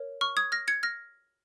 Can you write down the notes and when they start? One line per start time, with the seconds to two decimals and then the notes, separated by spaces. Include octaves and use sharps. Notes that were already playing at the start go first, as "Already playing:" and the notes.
Already playing: A#4 C#5
0.21 C#6 F6
0.37 D#6 G#6
0.52 F6 A#6
0.68 G#6 C#7
0.83 F6 A#6